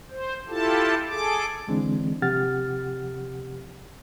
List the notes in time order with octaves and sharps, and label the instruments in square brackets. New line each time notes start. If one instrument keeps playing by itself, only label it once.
[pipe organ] C5
E4 F4 G4 A4 A5
G#4 A4 D6
[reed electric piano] D3 E3 G#3 C4 D4
C3 F3 G4 F#5 F6 A6